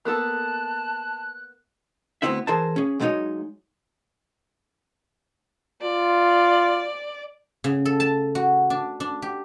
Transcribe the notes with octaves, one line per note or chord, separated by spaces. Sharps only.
A#3 B3 A4 A5 F#6
D2 G2 B3 C4 E4 E5
E3 G#4 A#4 C5 A5
C#4 G#4
F#3 G#3 B3 D#4 C#5 D#5
F4 D5
C#3
A4
A5
F#4
D4
D4
G4